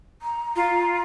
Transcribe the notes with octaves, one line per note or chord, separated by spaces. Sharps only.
A#5
F4